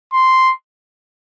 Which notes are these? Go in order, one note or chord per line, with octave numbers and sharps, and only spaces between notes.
C6